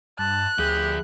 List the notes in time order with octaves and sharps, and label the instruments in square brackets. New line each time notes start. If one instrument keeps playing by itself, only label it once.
[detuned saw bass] G2 [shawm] A5 [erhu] F#6
[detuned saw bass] D2 [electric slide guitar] F3 G#4 [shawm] G4